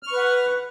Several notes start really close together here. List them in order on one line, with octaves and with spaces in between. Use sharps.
F6 C#6 B4 F#5